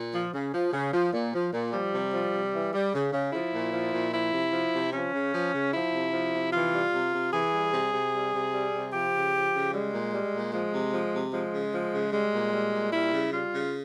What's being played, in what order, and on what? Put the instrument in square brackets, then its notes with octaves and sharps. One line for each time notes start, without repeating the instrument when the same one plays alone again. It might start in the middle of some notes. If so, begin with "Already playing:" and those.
Already playing: [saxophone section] A#2
F3
C#3
F3
C#3
F3
A#2
F3
A#2
F3 G3
C3
F3
C3
E3
G3
C#3
C#3
F3 E4
A#2
F3
A#2
F3 E4
C3
F3
C3
F3 C#4
C#3
F3
C#3
F3 E4
C3
F3
C3
E3 F4
G3
C3
C3
E3 G#4
G3
C3
C3
G3
C3
G3
C3
F3 G4
C#3
F3
C#3
G3 G#3
A#2
G3
A#2
F3 G#3
C3
F3
C3
F3 G#3
C#3
F3
C#3
G3 G#3
A#2
G3
A#2
G3 E4
C#3
G3 F4
C#3